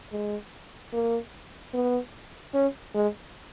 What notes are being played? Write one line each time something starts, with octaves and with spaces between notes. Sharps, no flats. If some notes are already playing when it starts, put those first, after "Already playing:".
G#3
A#3
B3
C#4
G#3